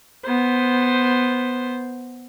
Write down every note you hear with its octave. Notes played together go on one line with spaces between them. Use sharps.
B3 C5